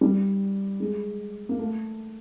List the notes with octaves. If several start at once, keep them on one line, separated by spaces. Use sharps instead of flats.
G3
G#3
A#3
A3